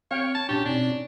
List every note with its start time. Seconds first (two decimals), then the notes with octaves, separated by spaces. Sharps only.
0.11 C4 C#5 F5 G5
0.35 A5
0.49 A#2 C#4 D4 G4 A5 C#6
0.65 B2 C4 D4 D#4